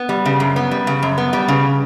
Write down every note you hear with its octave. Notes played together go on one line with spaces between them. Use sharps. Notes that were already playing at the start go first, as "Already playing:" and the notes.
Already playing: B3
G3
C#3
F#2
B3
G3
C#3
F#2
B3
G3
C#3